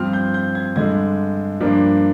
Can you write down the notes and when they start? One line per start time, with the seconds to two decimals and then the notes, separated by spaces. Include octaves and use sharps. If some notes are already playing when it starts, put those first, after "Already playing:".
Already playing: G2 F3 C4 F6
0.13 G6
0.34 G6
0.55 G#6
0.76 G2 D3 G#3 G#6
1.60 G2 F3 A#3 D4